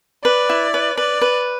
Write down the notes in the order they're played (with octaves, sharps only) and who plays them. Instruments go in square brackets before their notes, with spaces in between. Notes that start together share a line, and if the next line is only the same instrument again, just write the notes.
[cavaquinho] B4 [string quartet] D5
[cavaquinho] E4
B4
[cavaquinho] B4 [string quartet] D5
[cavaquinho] B4